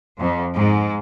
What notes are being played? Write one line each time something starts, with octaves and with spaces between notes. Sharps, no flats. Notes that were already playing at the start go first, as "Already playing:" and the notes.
F2
G#2